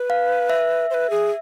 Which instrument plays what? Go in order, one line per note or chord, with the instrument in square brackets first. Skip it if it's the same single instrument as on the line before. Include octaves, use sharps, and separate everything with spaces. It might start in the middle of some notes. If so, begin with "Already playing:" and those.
Already playing: [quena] B4
[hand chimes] F5
E5
[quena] C5
B4
G#4